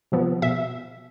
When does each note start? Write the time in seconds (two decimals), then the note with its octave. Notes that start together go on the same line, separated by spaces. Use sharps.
0.12 C3 F3 B3
0.42 B2 E5